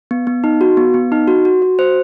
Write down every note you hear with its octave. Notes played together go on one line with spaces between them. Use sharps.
B3
B3
D#4
F#4
B3
B3
D#4
F#4
F#4
F#4
C5